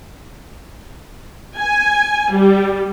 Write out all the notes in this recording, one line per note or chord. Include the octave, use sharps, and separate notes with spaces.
G#5
G3